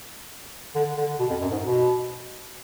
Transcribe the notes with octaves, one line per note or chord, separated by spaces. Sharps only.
D3
D3
B2
F2
F#2
G#2
B2